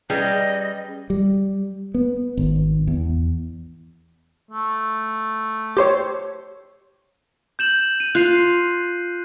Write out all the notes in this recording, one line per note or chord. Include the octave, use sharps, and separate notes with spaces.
G3 C#4 G#4 B4 D#5 G5
G3
B3
G#1
E2
A3
G4 C5 C#5
G6 E7 F#7
D#7
F4 F#6 C7